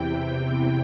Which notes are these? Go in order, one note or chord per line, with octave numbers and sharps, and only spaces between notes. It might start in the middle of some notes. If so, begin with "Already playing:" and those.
Already playing: E2 C3 E3 G5
G5